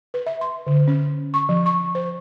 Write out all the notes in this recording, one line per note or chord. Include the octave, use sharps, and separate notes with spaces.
B4
E5
C6
D3
C#4
C#6
F3
C#6
C5